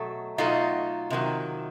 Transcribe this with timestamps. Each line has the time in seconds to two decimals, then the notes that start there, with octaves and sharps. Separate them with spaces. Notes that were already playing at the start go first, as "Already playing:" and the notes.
Already playing: B2 F#3 A3
0.38 B2 F#3 A3 D#4 F4
1.10 C3 D#3 F#3